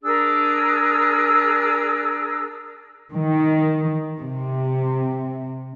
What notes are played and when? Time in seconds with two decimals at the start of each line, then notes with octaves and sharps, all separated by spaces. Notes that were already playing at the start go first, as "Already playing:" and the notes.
0.03 D4 G#4 A#4 E6
3.12 D#3
4.21 C3